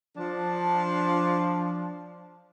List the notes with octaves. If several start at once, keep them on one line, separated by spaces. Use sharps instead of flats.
F3 D4